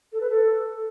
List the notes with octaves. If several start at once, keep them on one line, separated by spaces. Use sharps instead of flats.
A4
B4
A4